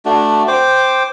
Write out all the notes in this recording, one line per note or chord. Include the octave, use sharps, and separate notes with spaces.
A3 D4 F#4
C5 G5 D6